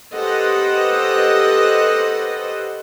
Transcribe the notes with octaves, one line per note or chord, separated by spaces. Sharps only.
G4 A4 B4 C5 D#5 F#5